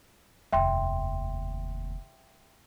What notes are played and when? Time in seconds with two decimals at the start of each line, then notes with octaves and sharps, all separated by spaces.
0.53 F1 D#2 E5 G5 C6